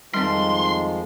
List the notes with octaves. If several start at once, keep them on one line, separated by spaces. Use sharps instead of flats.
F2 D#3 F3 G3 G#3 C4 C6